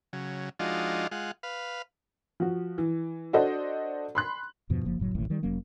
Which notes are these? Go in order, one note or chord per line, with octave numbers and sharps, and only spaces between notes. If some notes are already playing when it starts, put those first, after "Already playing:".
C#3 F#3
F3 G#3 D4 D#4 F4 F#4
G#3 F4 F#5
B4 F5
F3 F#4
E3
D4 F#4 A4 C5 D#5
B5 C6 F#6
E2 G2 B2 F3
F#1 F3 A#3
F#1 A2 F#3
E1 A1 D#2 A2
D#3 G3
F1 F#3 A#3 C#4